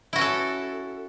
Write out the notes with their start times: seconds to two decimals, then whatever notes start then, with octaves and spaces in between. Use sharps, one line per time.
0.13 E4
0.16 F#4
0.18 C#4
0.21 A4